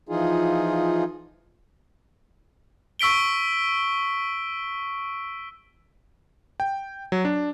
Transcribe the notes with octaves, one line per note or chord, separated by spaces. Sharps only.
E3 F3 D#4 F4 G#4
C#6 E6 B6 D7 G7
G5
F#3
D4